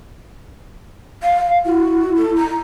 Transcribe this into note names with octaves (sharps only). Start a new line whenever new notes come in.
F5
E4 F#4
A4
A#5